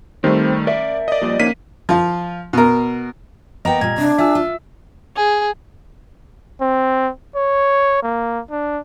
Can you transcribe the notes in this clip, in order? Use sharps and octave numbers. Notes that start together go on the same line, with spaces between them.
D#3 G3 A3 C4 C5
A#4 D5 E5
D5 D#5
A#2 F3 G3
F2 D#3 A#3 C#4 B6 D#7
F3 F4
B2 A#4
A#3 B3 D#5 G5 A#5
A#2 G3 G#6
C3 D4
F4 G#4 E5 E6
F4
G#4
C4
C#5
A#3
D4